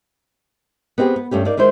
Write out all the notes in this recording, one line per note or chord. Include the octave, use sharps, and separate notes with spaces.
B3 C4 E4 G4 G#4
B3
G2 A3 C#4 G4
A#3 D#4 D5
D#3 G#3 E4 C5